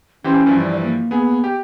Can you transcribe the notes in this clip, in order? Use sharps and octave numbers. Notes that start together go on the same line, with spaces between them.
E3 C#4 G4 C5
G2 E3 F3
D5
A#3
B3 G#4
G4